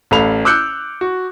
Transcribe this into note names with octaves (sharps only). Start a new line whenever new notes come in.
A1 A4 F5 B5 F7
D6 E6 F#6 G6 C#7
F#4